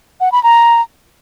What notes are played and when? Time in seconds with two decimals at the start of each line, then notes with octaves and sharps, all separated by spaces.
0.21 F#5
0.32 B5
0.43 A#5